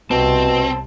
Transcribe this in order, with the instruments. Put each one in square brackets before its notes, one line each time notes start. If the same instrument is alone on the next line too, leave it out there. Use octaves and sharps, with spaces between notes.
[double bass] C2 [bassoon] B2 [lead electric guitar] C4 [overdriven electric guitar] A5